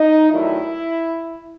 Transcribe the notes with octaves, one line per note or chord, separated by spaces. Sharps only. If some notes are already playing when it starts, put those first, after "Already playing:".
Already playing: D#4
G2 D#3 F#3 A3 E4